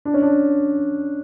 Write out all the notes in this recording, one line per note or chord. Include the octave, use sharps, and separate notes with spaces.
D4
C#4
D4